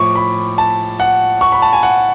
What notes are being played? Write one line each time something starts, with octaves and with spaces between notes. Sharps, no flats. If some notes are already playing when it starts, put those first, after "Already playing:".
Already playing: A2 F3 C#6 D6
B5
A5
F#5
C#6
B5
A5
G#5
F#5